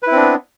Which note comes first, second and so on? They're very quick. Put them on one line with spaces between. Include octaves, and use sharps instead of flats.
B4 E4 C4 D4 B3